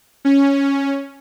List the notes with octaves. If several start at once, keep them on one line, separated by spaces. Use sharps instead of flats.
C#4